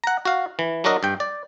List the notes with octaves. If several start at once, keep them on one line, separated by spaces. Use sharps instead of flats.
F#5 A#5
F#4 F5
E3
F#3 D4 F#4 A#4 D#5
G2 G5
D5